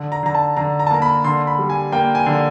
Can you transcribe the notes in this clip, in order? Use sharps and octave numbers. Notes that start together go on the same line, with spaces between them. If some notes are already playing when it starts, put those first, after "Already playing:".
Already playing: D3
A#5
D3 A#5
A5
D3 A#5
A#5
A5
A#3 A#5
B5
D3 C6
B5
G3
G#5
A#3 G5
G#5
D3